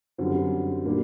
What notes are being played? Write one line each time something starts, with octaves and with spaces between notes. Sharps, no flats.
F#2 D3 G3 C4
A#2 G3 A#3 D4